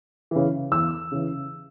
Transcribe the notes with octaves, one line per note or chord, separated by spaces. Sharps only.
C#3 E3
E2 E6
C#3 E3